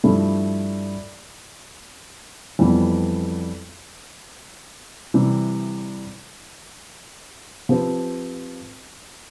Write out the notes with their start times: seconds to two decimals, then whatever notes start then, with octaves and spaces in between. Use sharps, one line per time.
0.04 G2 F3 A3 E4 G4
2.59 F2 E3 G3 B3
5.14 C3 E3 G3
7.69 F3 C4 G4 B4